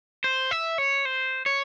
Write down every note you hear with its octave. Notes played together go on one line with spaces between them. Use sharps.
C5
E5
C#5
C5
C#5